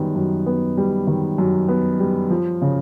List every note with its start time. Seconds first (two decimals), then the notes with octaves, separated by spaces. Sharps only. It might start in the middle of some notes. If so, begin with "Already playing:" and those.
Already playing: F#2 D#3 G3 B3
0.15 F#2
0.46 B3
0.77 G3
1.07 D#3
1.38 F#2
1.69 B3
2.00 G3
2.30 F3
2.62 C#3